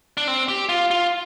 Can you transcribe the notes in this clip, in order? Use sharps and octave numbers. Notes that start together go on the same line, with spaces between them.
D4
C4
G4
F4
F4